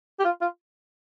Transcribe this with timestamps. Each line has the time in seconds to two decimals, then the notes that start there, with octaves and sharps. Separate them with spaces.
0.19 G4
0.25 F4
0.41 F4